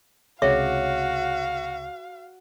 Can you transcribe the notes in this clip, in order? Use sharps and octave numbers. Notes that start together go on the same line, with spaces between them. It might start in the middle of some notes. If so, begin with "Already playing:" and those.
C#2 C3 F#4 G#4 C#5 E5 F5